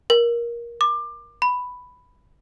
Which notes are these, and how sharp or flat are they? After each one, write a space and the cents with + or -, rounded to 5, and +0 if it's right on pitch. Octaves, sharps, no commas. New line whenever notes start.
A#4 +20
D6 +25
B5 +5